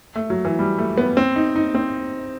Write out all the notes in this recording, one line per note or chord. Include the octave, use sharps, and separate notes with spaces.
A3
F#3
E3
G3
A3
B3
C4
D#4
D#4
C4